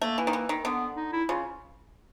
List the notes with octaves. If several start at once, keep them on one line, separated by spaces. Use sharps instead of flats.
A3 A#3
E3
D#3
E3
D#3
D3 B3
D#4
E4
C#3 F4